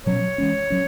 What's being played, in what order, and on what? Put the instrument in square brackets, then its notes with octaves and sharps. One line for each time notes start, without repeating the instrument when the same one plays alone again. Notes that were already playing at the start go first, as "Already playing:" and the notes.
[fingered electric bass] B2 F#3 C#4 [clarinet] C#5
[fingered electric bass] E3 G#3 C#4
F#3 C#4